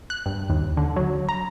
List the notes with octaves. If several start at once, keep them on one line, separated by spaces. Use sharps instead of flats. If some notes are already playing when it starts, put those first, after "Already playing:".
F#6
G2
D#2
D3
F#3
A#5